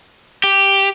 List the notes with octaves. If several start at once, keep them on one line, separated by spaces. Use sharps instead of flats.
G4